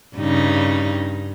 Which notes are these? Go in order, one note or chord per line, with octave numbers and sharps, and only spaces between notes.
G2 C#3 D#4